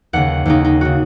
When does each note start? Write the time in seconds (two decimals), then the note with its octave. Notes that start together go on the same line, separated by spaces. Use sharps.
0.13 D#2 C#3 F#5
0.46 D#2 C#3 D#4
0.65 D#4
0.81 C#3 F#4